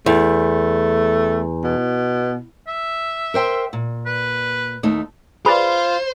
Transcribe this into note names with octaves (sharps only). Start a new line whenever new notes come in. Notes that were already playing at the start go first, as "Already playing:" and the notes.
E2 A3
B2
E5
A#4 C5 G5
A#2
B4
D#2 A3 D#4
F4 G#4 B4 C5 D5 B5